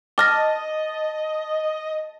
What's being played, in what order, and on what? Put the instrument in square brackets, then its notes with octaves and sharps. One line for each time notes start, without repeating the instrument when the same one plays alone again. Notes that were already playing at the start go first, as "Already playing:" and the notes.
[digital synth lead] D#5 [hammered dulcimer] A5 [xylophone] D6 F6 A#6